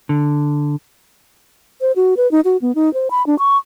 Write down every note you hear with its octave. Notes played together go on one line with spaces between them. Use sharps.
D3
C5
F#4
B4
D#4
F#4
B3
D#4
C5
B5
D4
C#6